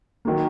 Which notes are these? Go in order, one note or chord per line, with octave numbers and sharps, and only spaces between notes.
D#3 F#3 A#3